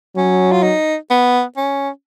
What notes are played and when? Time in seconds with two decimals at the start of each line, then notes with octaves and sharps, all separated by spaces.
0.16 F#3 C#4
0.52 F4
0.63 D#4
1.11 B3
1.57 C#4